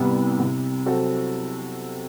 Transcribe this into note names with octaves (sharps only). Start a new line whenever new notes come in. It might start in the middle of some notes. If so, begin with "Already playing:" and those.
Already playing: C2 C3 G3 B3
C3
F#3 C4 F#4 A4